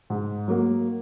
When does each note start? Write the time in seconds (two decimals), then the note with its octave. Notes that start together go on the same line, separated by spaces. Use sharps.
0.10 G#2
0.48 F#3 A#3